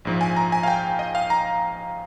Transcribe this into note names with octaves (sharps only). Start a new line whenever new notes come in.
A#1 G#2 F3
G#5
A#5
G#5
F5
G5
D#5
F5
A#5